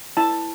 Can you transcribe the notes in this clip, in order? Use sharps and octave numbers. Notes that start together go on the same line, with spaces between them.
E4 A5